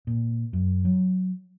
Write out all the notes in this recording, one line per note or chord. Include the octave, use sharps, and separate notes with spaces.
A#2
F#2
F#3